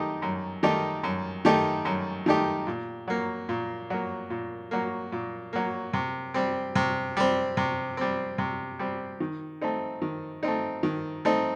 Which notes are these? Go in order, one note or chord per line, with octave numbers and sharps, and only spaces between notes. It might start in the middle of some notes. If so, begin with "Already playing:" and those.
Already playing: F#2 D#3 A3 D#4 G4
F#2
D#3 A3 D#4 G4
F#2
D#3 A3 D#4 G4
F#2
D#3 A3 D#4 G4
A#2
F#3 A#3
A#2
F#3 A#3
A#2
F#3 A#3
A#2
F#3 A#3
C3
G3 C4
C3
G3 C4
C3
G3 C4
C3
G3 C4
D#3
A3 C4 D#4
D#3
A3 C4 D#4
D#3
A3 C4 D#4